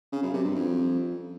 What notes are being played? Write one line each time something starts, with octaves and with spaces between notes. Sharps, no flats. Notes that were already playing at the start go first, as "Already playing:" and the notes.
C#3
F#2
C3
G2
F2